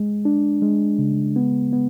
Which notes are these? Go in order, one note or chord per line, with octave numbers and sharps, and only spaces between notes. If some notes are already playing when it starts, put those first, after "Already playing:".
Already playing: G#3
D4
G#3
C#3
B3
B3